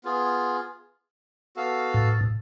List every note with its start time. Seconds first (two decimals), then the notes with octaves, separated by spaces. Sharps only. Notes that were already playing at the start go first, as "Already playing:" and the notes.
0.04 B3 F4 G#4
1.56 B3 F#4 A4 F5
1.94 A2